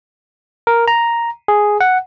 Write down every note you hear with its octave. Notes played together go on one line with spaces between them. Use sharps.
A#4
A#5
G#4
F#5